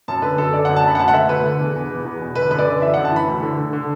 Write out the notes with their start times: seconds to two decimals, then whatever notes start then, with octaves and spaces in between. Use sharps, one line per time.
0.08 F#2 A5
0.22 D3 B4
0.37 F#2 A4
0.53 D3 D5
0.65 F#2 F#5
0.76 A5
0.84 F#2 B5
0.95 F#5
0.99 D2 A5
1.08 F#5
1.14 D2 E5
1.29 D2 B4
1.45 D3
1.60 E2
1.76 E2
1.91 E2
2.05 E2
2.20 B2
2.35 D3 B4
2.51 F#2 B4
2.59 D5
2.66 D3
2.82 E3 E5
2.94 F#2 F#5
3.05 A5
3.12 E3 B5
3.28 D2
3.43 D3
3.57 D3
3.73 D3